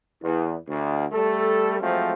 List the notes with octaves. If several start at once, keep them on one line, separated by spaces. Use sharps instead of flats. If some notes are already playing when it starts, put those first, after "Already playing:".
E2
D2
G3 A3 A4
F3 F#3 G#3 A3 C4